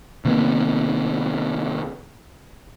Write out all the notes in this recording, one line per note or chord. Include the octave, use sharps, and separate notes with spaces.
C3 D#3 A#3 B3